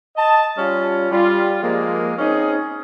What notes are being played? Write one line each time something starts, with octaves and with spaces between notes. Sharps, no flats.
D#5 A5
G3 C#4 F4
G3 F4
F3 G#3 A#3
C4 C#4 D#4 G#4